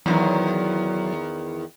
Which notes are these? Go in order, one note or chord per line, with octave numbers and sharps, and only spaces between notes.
E2 B2 D#3 F#3